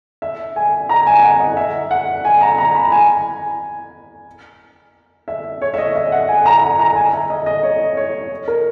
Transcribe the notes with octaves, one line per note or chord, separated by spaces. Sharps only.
E5
G#5
A#5
G#5
G#5
F#5
D#5
E5
F#5
G#5
A#5
A#5
B5
G#5
E5
C#5
E5
D#5
E5
F#5
G#5
A#5
A#5
A#5
G#5
E5
D#5
D#5
C#5
C#5
A#4